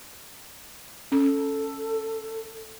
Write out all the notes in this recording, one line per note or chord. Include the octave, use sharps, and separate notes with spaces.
C#4 A4